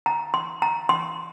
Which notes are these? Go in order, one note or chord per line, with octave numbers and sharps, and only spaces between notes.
A#5
C6
A#5
C6